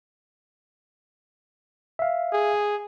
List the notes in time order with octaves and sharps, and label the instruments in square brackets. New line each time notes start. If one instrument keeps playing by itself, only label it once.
[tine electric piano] E5 F5
[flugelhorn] G#4